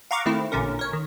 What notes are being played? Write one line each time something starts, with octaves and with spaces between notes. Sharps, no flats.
F5 F#5 A#5 C#6 D6
D#3 A3 C4 E4
A1 A#2 D3 C#4 A#4
A#4 C#5
D#3